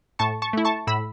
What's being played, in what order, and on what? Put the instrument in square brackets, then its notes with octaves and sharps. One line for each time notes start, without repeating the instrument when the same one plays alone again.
[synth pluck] A2 A5 C#6
A5 C#6
A3 E4
A5 C#6
A2 B5 E6